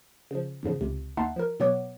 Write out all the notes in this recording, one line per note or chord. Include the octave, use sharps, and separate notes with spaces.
C#3 F3
E2 G#2 C#3 F3
C#2 C3
D#2 D#4 E5 F#5 A5 C6
F3 A#4
B2 F#3 B3 C#5 F#5 D6